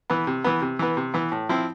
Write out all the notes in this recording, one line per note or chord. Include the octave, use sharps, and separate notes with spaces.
E3 B3
C3
E3 B3
C3
E3 B3
C3
E3 B3
A2
F3 C4 E4